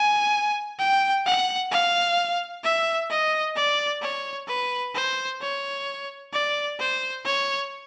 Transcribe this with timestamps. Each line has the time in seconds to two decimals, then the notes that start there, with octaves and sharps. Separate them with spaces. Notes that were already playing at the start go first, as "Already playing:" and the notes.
Already playing: G#5
0.79 G5
1.26 F#5
1.72 F5
2.64 E5
3.10 D#5
3.56 D5
4.02 C#5
4.48 B4
4.95 C5
5.41 C#5
6.33 D5
6.80 C5
7.25 C#5